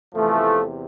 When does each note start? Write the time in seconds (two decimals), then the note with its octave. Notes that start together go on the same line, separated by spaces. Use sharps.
0.15 E2 C3 E3 F3 A3